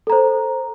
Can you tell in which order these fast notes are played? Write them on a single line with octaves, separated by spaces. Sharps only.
A4 A#5 C5